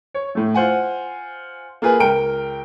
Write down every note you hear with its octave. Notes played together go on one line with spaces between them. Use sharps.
C#5
A2 A3
F4 C5 F#5 G#5
A#3 F4 G#4 B4
C#2 A#4 G5 D7